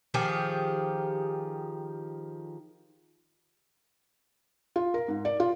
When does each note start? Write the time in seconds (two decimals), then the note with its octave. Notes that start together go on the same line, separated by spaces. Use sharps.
0.14 D#3 F3 G4 G#4
4.76 F4
4.94 A#4
5.08 G#2
5.25 D5
5.40 F4